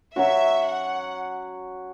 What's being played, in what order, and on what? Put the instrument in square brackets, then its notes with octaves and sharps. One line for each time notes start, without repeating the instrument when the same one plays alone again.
[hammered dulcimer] F#3 C#4 F#4 [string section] E5
[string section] F#5